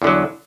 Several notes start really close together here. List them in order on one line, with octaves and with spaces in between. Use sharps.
E2 D3 F#3